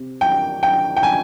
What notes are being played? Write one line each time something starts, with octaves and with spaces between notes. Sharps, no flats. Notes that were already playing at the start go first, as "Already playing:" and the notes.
Already playing: C3
G5
G5
G5
G#5